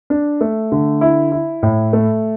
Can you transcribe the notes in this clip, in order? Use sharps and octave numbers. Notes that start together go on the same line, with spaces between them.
D4
A3
D3
E4
E4
A2
A3